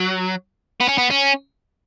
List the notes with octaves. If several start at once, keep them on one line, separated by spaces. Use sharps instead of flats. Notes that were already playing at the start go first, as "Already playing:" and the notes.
Already playing: F#3
B3
C#4
B3
C#4